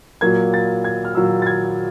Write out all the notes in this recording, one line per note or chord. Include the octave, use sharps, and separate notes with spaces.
A#2 F#3 A#3 G#6
A6
G#6
F6
A#2 F#3 A#3 E6
A6
G#6